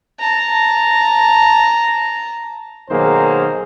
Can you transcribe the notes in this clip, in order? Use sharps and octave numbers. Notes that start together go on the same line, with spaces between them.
A5 A#5
B1 D#3 F#3 A#3 G#4 C5